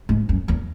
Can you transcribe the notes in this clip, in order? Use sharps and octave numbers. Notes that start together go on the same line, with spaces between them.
G#2
F#2
E2